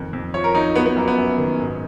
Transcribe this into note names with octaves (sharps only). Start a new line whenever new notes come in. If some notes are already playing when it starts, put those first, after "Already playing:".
Already playing: F2 D#3
F2
F3 C#5
A#4
F3 D#4
F#3 B3
B3
F#2 A#3
B3
F#2
D#3
G#2